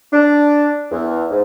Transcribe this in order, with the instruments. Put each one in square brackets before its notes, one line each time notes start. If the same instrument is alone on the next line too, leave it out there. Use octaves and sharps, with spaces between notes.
[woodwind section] D4
E2
G#2